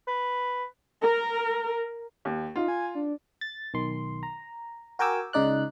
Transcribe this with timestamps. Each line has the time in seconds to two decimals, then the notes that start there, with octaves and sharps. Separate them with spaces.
0.07 B4
1.02 A#4
2.25 D#2
2.56 D#4 F4
2.68 G#5
2.95 D4
3.41 A6
3.74 B1 D#3 C6
4.23 A#5
4.99 F#4 A#4 G5 G#5 D6 E6
5.33 C#2 C#3 D#4 D5 F#6